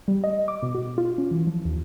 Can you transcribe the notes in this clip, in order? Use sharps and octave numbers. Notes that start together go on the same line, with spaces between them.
G3
D#5
D6
B2
F#4
F4
C#4
E3
F3
D#2